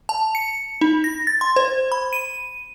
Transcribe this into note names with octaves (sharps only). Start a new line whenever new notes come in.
A5
C#7
D#4
A#6
A6
C6
C5
B5
D#7